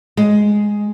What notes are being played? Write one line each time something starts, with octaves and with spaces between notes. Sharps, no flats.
G#3